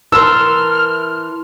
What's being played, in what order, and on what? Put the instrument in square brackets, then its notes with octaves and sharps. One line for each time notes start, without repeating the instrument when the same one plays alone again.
[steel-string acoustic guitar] E3 A#4 [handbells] A5 C6 [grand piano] E6 [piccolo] F6